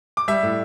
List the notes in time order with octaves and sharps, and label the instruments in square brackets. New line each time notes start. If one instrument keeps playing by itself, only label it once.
[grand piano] D6
G3 E5 E6
A2